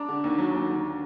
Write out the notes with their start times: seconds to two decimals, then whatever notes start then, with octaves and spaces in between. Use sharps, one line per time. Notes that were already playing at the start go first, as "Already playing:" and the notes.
Already playing: D4 A#5 D6
0.08 D3
0.24 D#2
0.38 F#3
0.55 D#2
0.69 D3